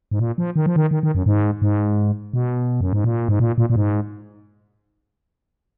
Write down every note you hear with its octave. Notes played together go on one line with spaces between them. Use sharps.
G#2
A#2
F3
D#3
F3
D#3
D#3
D#3
F#2
G#2
G#2
B2
F#2
G#2
A#2
G#2
A#2
A#2
A#2
G#2